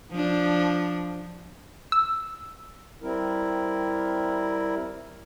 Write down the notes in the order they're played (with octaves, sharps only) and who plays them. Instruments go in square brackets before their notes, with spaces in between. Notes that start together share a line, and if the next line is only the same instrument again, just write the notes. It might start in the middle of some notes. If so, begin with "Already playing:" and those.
[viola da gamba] F3 D4
[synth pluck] E6
[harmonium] G3 C4 E4 A#4